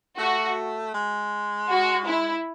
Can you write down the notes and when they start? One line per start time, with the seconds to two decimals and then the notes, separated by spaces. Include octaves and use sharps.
0.19 A3 F#4
0.94 G#3
1.70 F#4
2.08 E4